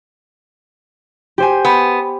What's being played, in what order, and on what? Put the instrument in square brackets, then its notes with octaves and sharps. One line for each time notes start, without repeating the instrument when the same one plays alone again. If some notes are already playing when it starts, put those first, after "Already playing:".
[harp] G4 C5 G#5
[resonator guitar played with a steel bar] B3